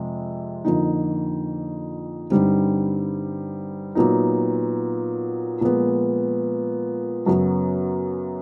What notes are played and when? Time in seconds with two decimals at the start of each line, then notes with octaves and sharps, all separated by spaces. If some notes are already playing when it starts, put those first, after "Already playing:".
Already playing: F2 C3 G#3
0.65 F2 D3 F3 A#3 D#4
2.30 G2 D3 G3 C4 D#4
3.95 A#2 F#3 B3 D#4
5.61 A#2 F3 G#3 B3
7.26 F#2 C#3 F#3 B3